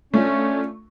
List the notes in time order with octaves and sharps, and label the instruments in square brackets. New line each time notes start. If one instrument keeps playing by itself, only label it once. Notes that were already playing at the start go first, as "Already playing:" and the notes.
[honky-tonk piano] A3 D4 F4 [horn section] C#4